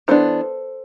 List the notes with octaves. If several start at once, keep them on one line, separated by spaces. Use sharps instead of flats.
E3 B3 D4 A4 C5